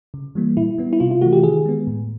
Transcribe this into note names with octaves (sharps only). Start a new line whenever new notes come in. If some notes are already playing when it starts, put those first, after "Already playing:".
C#3
E3 G3 A#3
A#2 E4
G3 B3
E4
C3 F4
F4
E3 A3 F#4
G4
D#3 G#4
G#3 B3
A2